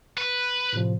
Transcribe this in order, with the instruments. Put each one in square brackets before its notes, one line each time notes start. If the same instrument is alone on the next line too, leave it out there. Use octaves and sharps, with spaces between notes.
[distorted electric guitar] B4
[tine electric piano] A2 C3 F3